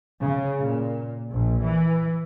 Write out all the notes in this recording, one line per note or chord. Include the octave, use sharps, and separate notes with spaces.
C#3
A#2
A#1
E3